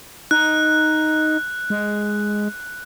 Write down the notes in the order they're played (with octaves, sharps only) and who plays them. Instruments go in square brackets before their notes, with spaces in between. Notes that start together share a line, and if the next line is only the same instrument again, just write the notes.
[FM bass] D#4 [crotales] F#6
[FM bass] G#3